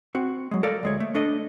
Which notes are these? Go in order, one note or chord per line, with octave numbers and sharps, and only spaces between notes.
C4 F#4
F#3 G#3
A4 A#4 D5 F5
D2 G#3 C#5
A3
A3 D4 A4 D#5